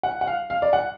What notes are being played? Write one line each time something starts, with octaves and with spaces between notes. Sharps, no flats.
F#5
F#5
F5
F5
D5
F#5